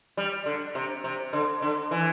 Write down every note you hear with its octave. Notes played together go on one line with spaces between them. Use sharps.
G3
D3
C3
C3
D3
D3
E3